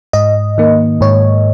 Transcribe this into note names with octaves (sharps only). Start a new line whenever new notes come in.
G#2 D#5
D#3 A#3
G#2 C#5